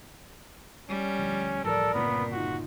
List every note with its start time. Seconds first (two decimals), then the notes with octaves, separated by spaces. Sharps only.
0.89 G3 C#4
1.19 D2 F3
1.65 D1 A1 F3 A4 A#4 D5
1.94 G1 A#2 C#3 B3 C4
2.32 D#4 F4 F#4